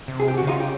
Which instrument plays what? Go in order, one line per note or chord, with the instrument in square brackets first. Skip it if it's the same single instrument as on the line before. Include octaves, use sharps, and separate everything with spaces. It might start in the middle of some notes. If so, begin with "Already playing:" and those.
[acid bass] C3
[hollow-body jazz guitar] G#4
G4
F#4
[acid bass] D3
[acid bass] C#3 [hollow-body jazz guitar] D#4 F4
[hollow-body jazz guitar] G4